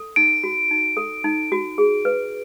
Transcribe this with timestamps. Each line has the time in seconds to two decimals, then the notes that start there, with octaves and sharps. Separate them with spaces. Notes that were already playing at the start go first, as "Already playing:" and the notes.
Already playing: A4
0.16 D#4 D7
0.44 F#4
0.71 D#4
0.97 A4
1.24 D#4
1.52 F#4
1.78 G#4
2.05 B4